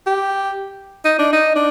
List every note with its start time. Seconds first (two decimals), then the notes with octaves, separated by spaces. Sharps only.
0.07 G4
1.05 D#4
1.19 D4
1.33 D#4
1.55 D4